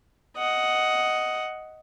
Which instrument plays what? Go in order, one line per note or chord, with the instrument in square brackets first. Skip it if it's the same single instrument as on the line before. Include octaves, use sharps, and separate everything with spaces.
[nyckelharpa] D#5 F#5